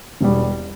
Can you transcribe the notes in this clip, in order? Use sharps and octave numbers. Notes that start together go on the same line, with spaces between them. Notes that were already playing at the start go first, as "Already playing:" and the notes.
E1 E2 B2 G3